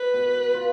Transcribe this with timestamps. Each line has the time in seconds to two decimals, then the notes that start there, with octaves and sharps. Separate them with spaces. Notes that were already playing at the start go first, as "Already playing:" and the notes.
Already playing: B4
0.13 B2
0.54 F4